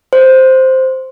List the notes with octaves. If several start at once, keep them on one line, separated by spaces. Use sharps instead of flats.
C5